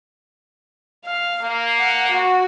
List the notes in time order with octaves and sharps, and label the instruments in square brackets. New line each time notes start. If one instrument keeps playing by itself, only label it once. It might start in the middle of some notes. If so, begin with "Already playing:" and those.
[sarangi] F5
[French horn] A#3
[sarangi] F#5
F#4